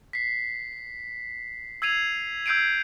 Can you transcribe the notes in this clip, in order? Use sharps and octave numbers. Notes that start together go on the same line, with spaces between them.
B6 C7
E6 G#6 C7 D#7 F7
E6 G6 G#6 C7 D7 D#7